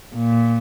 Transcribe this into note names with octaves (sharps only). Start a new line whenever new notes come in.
A#2